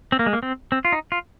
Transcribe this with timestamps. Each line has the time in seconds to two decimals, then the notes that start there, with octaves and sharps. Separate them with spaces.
0.12 C4
0.19 A#3
0.26 G#3
0.33 A#3
0.43 C4
0.72 C4
0.85 F4
0.92 D#4
1.12 F4